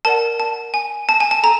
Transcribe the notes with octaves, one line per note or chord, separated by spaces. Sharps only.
A#4 D5 F#5 A5
A5
G#5
A5
G#5
A5
A4 A#5